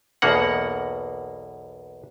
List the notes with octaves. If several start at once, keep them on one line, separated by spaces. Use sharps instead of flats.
B1 E2 B2 A#3 F#5